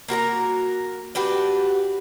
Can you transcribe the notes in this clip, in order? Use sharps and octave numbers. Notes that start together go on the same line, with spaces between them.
A#3 F#4 A#4 A#5
D4 F#4 G4 B4